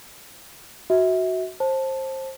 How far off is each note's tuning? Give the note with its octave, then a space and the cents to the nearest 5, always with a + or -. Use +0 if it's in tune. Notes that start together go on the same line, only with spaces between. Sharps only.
F#4 +0 E5 -30
C5 +20 A5 +0